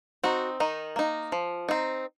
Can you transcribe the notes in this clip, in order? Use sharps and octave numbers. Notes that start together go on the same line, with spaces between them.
C4 D#4 F#4
D#3 D#4
A#3 D#4
F3
C4 D#4